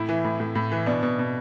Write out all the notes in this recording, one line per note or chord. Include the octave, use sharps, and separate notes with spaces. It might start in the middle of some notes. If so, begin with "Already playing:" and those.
Already playing: A2 E4
E3
A2
A2
A2
E3
B2 D4
B2
B2